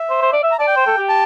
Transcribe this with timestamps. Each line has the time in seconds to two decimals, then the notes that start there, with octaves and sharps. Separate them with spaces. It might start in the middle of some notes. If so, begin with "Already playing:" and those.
Already playing: E5
0.10 C5
0.22 C5
0.33 D5
0.43 E5
0.52 A#5
0.59 D5 A5
0.67 G5
0.76 C5
0.86 A4
0.97 G4
1.09 A5